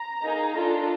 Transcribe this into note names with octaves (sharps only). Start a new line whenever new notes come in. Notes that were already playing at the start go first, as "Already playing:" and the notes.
Already playing: A#5
A#3 D#4 G#4
D4 F4 A4